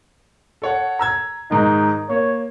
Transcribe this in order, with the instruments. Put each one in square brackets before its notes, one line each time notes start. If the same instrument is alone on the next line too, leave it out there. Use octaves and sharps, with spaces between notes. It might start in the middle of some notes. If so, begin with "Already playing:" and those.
[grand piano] A4 C#5 F#5
A#5 E6 G#6
[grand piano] G#2 D#3 [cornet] D#4
[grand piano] A#3 [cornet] C#5